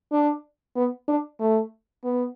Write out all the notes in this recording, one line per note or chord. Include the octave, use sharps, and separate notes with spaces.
D4
B3
D4
A3
B3